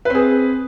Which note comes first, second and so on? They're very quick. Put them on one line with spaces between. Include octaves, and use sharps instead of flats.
B4 C4 G#4